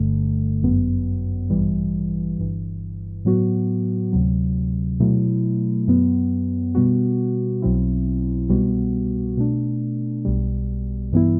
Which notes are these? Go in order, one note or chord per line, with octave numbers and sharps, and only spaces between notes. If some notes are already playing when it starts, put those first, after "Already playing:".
Already playing: G1 G2 D3 A3
G1 F#2 F#3 B3
A1 G2 E3 G3
G1 G2 E3
A2 F#3 B3 F#4
D2 C3 F#3
B2 F#3 A3 E4
F#2 F#3 B3
B2 G3 B3 F#4
B1 B2 F#3 C4 E4
C2 B2 G3 B3 F#4
B2 A3 D4
B1 B2 G3
G2 E3 B3 E4